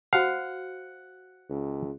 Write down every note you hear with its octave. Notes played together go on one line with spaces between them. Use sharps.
F#4 C5 F5 F#5
C#2